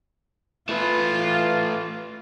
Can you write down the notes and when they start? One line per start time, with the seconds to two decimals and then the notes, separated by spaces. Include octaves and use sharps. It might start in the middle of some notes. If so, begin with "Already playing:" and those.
0.69 A3 F4 B4